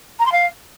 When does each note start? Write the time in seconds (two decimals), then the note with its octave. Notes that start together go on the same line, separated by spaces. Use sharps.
0.19 A#5
0.26 C6
0.32 F5